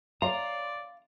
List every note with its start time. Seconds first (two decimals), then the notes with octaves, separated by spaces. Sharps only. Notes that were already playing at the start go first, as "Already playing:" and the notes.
0.22 C#5 D5 F5 A#5 C6